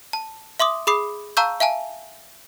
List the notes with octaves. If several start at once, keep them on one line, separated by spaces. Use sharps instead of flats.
A5
E5 C6 D6 D#6
G#4 B5 D6 D#6 C7
F5 A5 A#5 C#6 E6 G6
E5 F5 G#5 A5